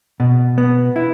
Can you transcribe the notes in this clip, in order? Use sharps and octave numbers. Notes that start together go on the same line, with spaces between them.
B2
B3
E4